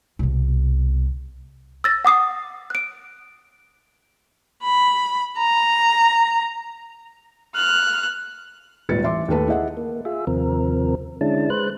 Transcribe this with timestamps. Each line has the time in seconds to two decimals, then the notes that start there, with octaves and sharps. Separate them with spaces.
0.19 C2 B2
1.84 E6 A6 A#6
2.05 F#5 D6 D#6 C7
2.70 F#6 D7
4.63 B5
5.38 A#5
7.55 F6 F#6
8.89 D#1 G#1 A#2 B4 A6 C#7
9.03 A1 E5 C6 D6
9.28 D#2 A3 A4 B4 A5
9.48 E4 G#4 D#5 E5 F#5
9.77 A#3
10.05 F4 G#4 E5
10.27 D#2 C3 F3 C4 A#4
11.21 D3 G#3 C#4 D4 E4 A5
11.50 G#3 B4 C5 F#6